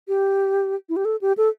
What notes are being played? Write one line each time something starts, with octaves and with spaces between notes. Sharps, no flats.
G4
E4
G4
A4
G4
A4